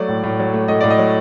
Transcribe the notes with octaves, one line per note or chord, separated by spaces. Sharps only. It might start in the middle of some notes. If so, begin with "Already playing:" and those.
Already playing: F#3 A3 D5
A2
A2
F#3
A3
A2 D#5
A2 D5
D#5
F#3